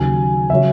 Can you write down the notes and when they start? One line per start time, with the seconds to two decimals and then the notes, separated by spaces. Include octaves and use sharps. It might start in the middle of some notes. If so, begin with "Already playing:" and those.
Already playing: D#2 C#3 F#3 G#5
0.50 C#3 F#3 C#4 E5